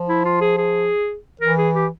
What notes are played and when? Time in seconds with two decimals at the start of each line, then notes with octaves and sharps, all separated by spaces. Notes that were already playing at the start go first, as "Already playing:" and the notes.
Already playing: F3
0.08 E4
0.25 F4
0.41 G#4
0.58 G#4
1.41 E3 A#4
1.58 G#4
1.75 G4